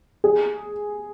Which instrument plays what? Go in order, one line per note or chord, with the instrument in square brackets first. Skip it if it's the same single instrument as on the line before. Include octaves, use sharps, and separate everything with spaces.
[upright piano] G#4